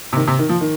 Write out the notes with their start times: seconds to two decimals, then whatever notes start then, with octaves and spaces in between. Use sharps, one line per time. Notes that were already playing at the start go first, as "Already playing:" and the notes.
0.13 C3
0.17 D#3
0.27 C3
0.39 D#3
0.49 F3
0.61 D#3